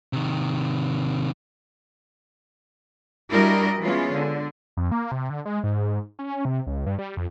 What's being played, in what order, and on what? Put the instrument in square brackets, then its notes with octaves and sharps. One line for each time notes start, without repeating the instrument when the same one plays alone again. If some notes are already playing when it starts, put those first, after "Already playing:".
[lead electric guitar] C3 D#3
[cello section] G3 D4 E4 F#4 A#4 D#5
E3 G#3 B3 C#4 F4
D3
[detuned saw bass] F2
A#3
C3
D3
G#3
G#2
C#4
C3
C#2
G2
G3
F2